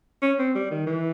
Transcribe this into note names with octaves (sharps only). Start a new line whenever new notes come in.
C#4
C4
G3
D#3
E3